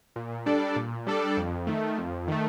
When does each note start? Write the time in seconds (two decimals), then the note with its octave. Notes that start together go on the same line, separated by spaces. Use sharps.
0.16 A#2
0.46 G3 D4 A4 D5
0.76 A#2
1.07 G3 D4 A4 D5
1.37 F2
1.67 D#3 A3
1.98 F2
2.28 D#3 A3